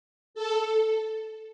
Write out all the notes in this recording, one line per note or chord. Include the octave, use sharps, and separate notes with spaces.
A4